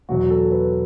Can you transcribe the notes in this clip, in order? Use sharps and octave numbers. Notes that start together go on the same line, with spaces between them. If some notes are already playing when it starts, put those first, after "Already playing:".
E2 B2 F#3 F#4
A4
B4